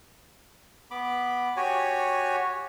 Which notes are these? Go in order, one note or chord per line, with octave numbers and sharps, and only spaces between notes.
B3 B5 D6
F#4 G4 C#5 G#5